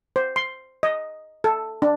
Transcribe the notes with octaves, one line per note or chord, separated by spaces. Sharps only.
C5
C6
D#5
A4
D4